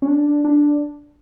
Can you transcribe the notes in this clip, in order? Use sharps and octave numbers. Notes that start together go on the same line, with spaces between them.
C#4
D4
D4